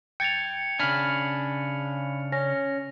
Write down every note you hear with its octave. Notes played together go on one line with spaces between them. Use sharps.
G5 G#6 A6 C#7 F7
C#3 D4 G#5 B5 F6
C#4 A#6